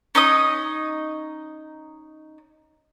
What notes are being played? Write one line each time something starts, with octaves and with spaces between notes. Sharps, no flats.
C#4 D#4 D#5 D#6